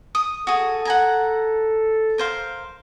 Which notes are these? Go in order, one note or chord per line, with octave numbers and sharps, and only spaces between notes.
D#6
F#4 G#4 A4
F#5 G#5 A#5
A#4 C5 F5